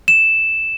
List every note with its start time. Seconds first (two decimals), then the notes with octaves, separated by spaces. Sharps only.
0.08 E7